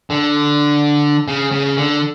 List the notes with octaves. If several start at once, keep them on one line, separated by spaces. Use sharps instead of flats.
D3
C#3
C#3
D3